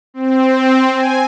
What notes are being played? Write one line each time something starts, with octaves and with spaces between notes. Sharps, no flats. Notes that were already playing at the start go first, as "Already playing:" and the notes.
C4
G#5